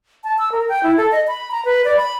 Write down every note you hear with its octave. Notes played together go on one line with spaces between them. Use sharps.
A5
E6
A#4
G5
E4
A4
D#5
B5
A#5
B4
D5
B5